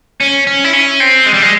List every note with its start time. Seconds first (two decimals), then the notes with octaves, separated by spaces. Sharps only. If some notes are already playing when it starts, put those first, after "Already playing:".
0.20 C#4
0.47 C#4
0.64 E4
0.73 C#4
1.00 C4
1.26 G#3
1.34 G3
1.42 G#3